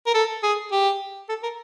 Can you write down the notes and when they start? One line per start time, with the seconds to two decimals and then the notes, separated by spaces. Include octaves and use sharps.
0.06 A#4
0.15 A4
0.43 G#4
0.72 G4
1.29 A4
1.43 A#4